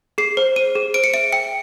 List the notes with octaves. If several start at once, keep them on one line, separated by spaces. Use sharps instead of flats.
G#4 C7
C5
C5 D#7
G#4
C5 D7
C#7
E5 D7
G5 C#7